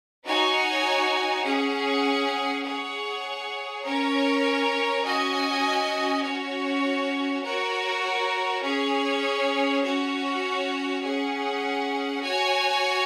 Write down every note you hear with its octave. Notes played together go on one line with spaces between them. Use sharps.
D#4 F#4 C#5 G#5
C#4 G#4 F#5
G#4 C#5 F#5
C#4 A#4 C#5
C#4 F#4 D#5 G#5
C#4 F#4 C#5
F#4 A#4 C#5
C#4 G#4 C#5
C#4 F#4 C#5
C#4 G#4 F#5
F#4 C#5 G#5